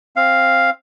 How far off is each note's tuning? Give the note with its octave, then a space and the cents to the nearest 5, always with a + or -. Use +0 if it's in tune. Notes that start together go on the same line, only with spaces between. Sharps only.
C4 +15 F5 +0